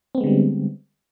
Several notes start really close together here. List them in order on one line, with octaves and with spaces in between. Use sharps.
C4 B3 G#3 D3 G3